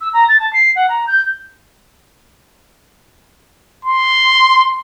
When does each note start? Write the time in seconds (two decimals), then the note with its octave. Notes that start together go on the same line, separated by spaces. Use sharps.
0.01 E6
0.13 A#5
0.28 A6
0.40 A5
0.53 C7
0.76 F#5
0.89 A#5
1.07 G6
3.85 C6